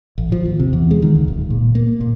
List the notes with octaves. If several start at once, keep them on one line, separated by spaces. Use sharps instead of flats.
A1
F3
D#2
C3
E2
G#3
D#3
C#2
D1
A#2
A#3
A#2